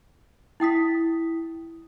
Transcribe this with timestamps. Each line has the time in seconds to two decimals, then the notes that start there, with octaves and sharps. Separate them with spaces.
0.60 E4 G5 D#6 B6